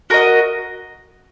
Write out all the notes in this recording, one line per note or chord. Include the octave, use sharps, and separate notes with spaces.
F#4 A#4 D#5